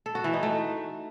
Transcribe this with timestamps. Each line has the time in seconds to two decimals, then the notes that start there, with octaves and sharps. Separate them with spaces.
0.06 A4
0.15 F#4
0.24 E3
0.33 D#4
0.43 A3